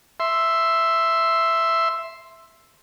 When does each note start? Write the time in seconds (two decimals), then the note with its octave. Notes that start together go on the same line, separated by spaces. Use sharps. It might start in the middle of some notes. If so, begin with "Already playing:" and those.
0.20 E5 C6